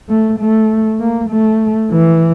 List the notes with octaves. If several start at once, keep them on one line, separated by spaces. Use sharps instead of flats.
A3
A3
A#3
A3
E3